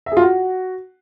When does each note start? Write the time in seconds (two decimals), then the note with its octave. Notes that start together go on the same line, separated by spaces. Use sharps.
0.06 E5
0.12 G#4
0.17 F4
0.22 F#4